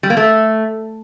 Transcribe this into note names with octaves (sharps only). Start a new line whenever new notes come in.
G3
A#3
A3